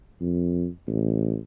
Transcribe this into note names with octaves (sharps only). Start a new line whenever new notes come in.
F2
A1